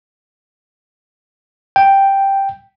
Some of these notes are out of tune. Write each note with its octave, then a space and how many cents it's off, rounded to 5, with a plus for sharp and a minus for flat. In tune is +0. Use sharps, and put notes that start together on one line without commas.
G5 +0